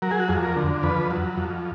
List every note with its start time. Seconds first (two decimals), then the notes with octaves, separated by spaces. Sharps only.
0.02 F#3 A#4
0.11 G#4
0.20 F#4
0.29 F2 G#4
0.43 A#4
0.56 D3
0.83 F2 B4
1.11 F#3
1.37 F2